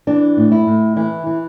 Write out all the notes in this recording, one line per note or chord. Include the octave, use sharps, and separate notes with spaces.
E3 D4
A2
E4
A2
E3 E4
E3